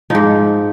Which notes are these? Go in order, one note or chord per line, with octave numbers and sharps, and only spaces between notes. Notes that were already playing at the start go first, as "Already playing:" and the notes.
G#2 F3 D#4